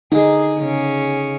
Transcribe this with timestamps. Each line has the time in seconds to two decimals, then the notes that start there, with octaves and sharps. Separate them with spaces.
0.12 D3 G#3 D#4 G#4
0.60 C#3 C#4